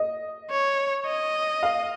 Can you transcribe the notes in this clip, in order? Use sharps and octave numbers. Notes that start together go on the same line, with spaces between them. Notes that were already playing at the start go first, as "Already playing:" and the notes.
Already playing: D#5
C#5
D#5
F5